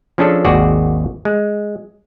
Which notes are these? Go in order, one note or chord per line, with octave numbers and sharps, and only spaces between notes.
F3 C#4 D4 G#4 A4
G#1 D#2 F#4 G#4 D5
G#3